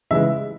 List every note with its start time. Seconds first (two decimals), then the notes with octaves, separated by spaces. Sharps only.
0.11 C#3 E3 G#3 E5